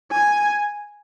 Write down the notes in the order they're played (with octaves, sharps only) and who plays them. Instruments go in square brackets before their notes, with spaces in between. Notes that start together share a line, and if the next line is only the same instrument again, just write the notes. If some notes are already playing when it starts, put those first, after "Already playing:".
[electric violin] G#5